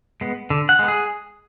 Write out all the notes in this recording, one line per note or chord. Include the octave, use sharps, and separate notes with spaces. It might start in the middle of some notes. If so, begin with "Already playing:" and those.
G#3 B3
D3
F#5
G#3 B3
G#4